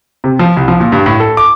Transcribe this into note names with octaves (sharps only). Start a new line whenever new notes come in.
C3
F3
C2
F3
A#2
G2
A2
A4
D6